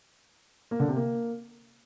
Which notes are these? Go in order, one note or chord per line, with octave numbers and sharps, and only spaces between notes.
A#3
D3
C3
A#3